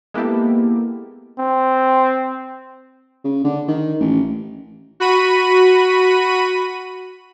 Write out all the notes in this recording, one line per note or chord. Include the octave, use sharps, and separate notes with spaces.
G#3 A#3 B3 E4 G4 A4
C4
C#3
D3
D#3
A1
F#4 B5 D#7